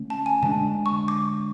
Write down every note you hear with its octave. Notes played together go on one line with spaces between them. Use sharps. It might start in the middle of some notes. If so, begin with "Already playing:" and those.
Already playing: D3 A3 C#4
A5
G#5
D3 G#3 D4 A5
C#6
D6